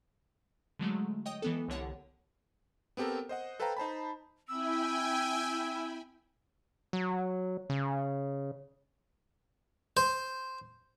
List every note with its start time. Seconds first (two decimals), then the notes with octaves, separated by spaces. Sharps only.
0.80 D3 F#3 G#3 A3
1.26 C#5 D#5 G5 D#6
1.42 E3 B3 A4
1.68 C2 D3 C#5 F#5
2.97 B3 C4 G4 A4 A#4
3.29 C5 D#5 F#5
3.60 A4 B4 C5 F5 G5 A#5
3.77 D#4 C5 A5 B5
4.48 C4 E4 E5 G5 G#5 B5 E6
6.93 F#3
7.70 C#3
9.97 C5